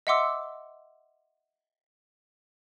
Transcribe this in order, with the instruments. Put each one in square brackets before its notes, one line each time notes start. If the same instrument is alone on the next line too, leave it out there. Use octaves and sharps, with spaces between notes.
[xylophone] D#5 E5 F#5 C6 D6 E6